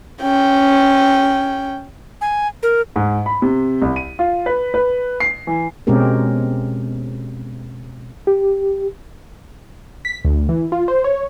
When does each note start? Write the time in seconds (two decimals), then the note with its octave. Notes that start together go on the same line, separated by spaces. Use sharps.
0.22 C#4 G5
2.21 G#5
2.63 A#4
2.96 G#2
3.26 B5
3.42 C3
3.82 C2
3.96 D#7
4.19 F4
4.46 B4
4.74 B4
5.20 C7
5.47 E3
5.87 B2 G#3 C4 C#4 G4 A#4
8.27 G4
10.05 B6
10.25 D2
10.49 E3
10.72 F4
10.88 C5
11.04 C#5